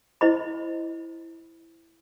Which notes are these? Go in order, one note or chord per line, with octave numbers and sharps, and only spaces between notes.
E4 C5 D#5 B5